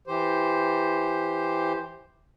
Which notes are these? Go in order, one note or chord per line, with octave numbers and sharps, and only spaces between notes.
E3 G4 C5